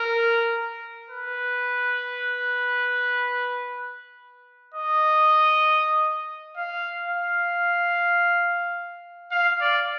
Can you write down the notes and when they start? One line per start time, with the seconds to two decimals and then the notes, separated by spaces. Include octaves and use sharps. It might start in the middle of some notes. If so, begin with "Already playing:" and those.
Already playing: A#4
1.10 B4
4.74 D#5
6.57 F5
7.03 F5
9.31 F5
9.61 D5